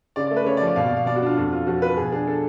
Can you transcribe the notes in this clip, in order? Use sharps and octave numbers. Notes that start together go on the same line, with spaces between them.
C#3 D5
A3 D5
B4
C#3 C#5
D5
F3
D5
B2 F5
B2 D5
F5
B2 D5
F#4
D4 F4
F2 F#4
F2 F4
F3 F#4
F3 B4
B2 G#4
D4 G#4
D4 A4